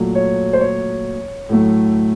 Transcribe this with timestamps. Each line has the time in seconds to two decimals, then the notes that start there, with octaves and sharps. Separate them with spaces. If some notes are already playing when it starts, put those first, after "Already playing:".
Already playing: A#2 F#3 A3
0.15 C#5
0.53 C5
0.61 C#5
1.49 A2 F#3 A3